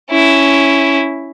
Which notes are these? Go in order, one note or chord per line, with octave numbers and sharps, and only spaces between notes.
C#4 E4